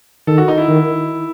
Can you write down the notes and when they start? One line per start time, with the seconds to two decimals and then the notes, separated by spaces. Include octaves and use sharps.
0.27 D#3 A4
0.38 F#4
0.48 D#4
0.58 E4
0.68 D#3